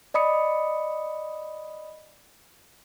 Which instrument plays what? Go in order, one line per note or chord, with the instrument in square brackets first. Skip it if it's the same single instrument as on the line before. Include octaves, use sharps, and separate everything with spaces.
[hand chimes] D5 D#5 B5 D#6 C#7